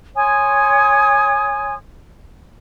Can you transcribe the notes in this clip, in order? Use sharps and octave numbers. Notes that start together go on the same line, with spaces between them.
C#5 G#5 C6 D#6